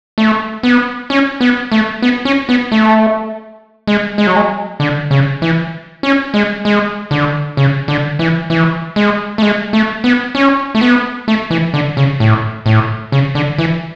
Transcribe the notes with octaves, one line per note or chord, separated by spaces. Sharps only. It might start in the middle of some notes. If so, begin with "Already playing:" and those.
A3
B3
C#4
B3
A3
B3
C#4
B3
A3
G#3
G#3
F#3
G#3
D3
C#3
E3
C#4
G#3
G#3
D3
C#3
D3
E3
E3
G#3
A3
G#3
A3
B3
C#4
A3
B3
A3
E3
D3
C#3
A2
A2
C#3
D3
E3